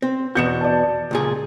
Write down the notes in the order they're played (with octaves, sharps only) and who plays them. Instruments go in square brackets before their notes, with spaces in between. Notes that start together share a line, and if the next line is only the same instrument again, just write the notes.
[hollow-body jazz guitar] C4
[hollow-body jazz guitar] E2 B2 F#4 [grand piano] G6 C#7 E7
[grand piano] D5 A5
[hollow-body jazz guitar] C#2 A#2 G#4